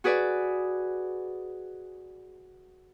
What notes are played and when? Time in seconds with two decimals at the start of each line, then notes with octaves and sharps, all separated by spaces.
0.04 F#4 G#4 B4 D5